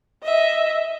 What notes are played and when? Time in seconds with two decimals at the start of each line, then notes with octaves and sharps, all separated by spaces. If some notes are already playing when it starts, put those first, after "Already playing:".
0.23 D#5 E5